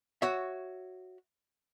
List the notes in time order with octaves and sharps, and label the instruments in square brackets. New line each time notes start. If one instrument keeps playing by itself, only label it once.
[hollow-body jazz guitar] F#4 C#5 E5